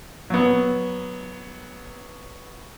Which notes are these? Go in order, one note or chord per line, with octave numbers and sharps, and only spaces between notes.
F#3 B3